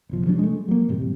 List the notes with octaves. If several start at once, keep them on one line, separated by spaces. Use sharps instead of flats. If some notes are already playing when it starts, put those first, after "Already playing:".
F#1 B1 F3
C3 F3 F#3 D4
G#3 A3
F#3 A#3
E1 G#2 C3 G3